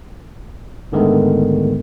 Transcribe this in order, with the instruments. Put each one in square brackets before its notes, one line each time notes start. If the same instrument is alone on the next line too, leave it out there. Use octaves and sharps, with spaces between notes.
[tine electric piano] G#2 D3 D#3 G#3 A3 B3